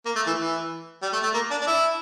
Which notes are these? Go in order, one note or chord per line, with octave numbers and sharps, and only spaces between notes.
A#3
A3
E3
E3
G3
A3
A3
A#3
D4
D4
E4